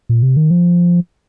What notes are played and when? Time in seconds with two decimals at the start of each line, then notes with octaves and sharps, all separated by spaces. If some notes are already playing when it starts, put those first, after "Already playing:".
0.09 A#2
0.22 C3
0.37 D#3
0.51 F3